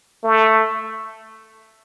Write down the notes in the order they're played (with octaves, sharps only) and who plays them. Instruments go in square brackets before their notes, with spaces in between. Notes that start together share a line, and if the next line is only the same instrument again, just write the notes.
[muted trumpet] A3